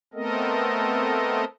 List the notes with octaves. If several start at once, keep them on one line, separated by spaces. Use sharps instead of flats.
A3 B3 C4 A4 A#4 D#5